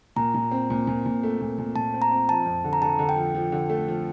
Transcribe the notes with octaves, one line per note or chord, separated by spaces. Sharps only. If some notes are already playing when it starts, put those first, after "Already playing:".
A#2 A#5
A#2
C4
A#2
A#2
A#2
A3
A#2
A#2
A#2 A5
C4
A#5
C4
F3 A5
F2
D3
A#5
D3 A5
D3
G5
F3
F3
D3
A3
F3